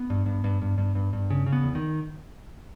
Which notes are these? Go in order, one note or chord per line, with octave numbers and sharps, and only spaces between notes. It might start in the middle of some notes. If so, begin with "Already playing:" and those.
Already playing: B3
G2
G2
G2
G2
G2
G2
G2
C#3
C#3
B3
E2
D#3